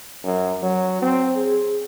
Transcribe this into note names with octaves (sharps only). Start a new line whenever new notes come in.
F#2
F#3
C4
G#4